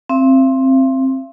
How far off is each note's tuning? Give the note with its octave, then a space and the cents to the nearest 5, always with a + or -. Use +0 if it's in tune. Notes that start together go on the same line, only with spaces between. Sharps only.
C4 +15 F5 -45